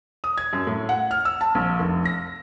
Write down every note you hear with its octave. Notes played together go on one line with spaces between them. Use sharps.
D#6
G#6
F#2
A2
F#5
F6
E6
A5
A#1
F1
A#6